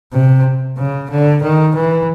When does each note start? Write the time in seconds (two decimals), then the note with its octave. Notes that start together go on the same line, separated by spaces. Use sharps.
0.13 C3
0.77 C#3
1.10 D3
1.42 D#3
1.75 E3